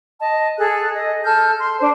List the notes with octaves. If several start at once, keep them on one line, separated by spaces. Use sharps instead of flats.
D#5 A5
G#4 A4 F#6
D#5
A4 F6 G6
C6
D4 C5